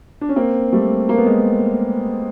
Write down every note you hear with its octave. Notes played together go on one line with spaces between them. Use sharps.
D4
C#4
A#3 C4
G3 A3
A#3
B3
G#3 A#3